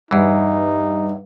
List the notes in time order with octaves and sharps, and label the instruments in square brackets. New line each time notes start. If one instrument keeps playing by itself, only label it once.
[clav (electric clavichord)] E2 E3 [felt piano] G2 [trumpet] D#4